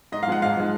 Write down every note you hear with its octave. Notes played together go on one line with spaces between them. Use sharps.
G#2 D#5
F5
F3 G#3 F#5
G#2 F5
F3 G#3